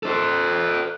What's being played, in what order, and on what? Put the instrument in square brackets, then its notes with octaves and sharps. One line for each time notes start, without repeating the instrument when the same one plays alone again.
[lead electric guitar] A4 C5